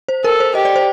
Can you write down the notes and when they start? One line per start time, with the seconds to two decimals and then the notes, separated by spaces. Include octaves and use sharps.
0.08 C5
0.24 A4 A#4
0.40 C5
0.55 G4 D#5
0.65 D5
0.76 C5